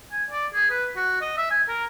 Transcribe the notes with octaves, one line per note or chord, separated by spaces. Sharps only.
G#5
D5
G#4
B4
F#4
D#5
E5
G#5
A#4